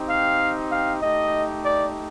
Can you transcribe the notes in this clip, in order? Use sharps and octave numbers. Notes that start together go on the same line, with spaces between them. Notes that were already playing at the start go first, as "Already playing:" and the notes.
Already playing: C4 D#4 G4
F5
F5
A3 D#4 G4 D#5
D5